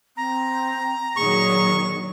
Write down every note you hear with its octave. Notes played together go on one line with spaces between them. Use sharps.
C4 A#5
A#2 D#3 F#3 G#4 C#6